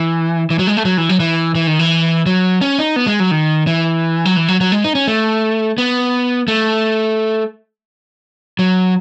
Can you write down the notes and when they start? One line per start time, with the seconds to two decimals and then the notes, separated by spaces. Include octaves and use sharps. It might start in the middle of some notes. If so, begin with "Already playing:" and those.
Already playing: E3
0.50 E3
0.59 F#3
0.67 G#3
0.77 A3
0.85 F#3
0.98 E3
1.09 F#3
1.20 E3
1.55 E3
1.67 D#3
1.79 E3
2.26 F#3
2.61 C#4
2.78 D#4
2.96 B3
3.07 G#3
3.20 F#3
3.31 D#3
3.67 E3
4.25 F#3
4.36 E3
4.48 F#3
4.61 F#3
4.72 G#3
4.84 D#4
4.95 C#4
5.07 A3
5.78 B3
6.48 A3
8.59 F#3